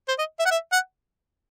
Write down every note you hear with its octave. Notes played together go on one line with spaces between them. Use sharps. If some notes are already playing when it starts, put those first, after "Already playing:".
C5
D#5
E5
F#5
E5
F#5